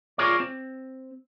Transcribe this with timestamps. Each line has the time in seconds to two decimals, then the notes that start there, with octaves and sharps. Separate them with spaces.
0.18 F4 G#4 A#4 C#5 D5
0.40 C4